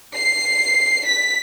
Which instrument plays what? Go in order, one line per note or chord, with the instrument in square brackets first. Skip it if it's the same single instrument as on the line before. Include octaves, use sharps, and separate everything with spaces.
[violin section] C7
B6